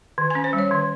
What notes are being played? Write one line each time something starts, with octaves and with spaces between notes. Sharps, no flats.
D#3
C#4 G#5
C5
G3
C#5
D#3